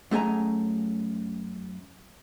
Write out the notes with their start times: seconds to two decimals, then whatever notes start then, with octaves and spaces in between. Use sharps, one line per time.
0.11 F#2 A3 G#4 G#5 A#5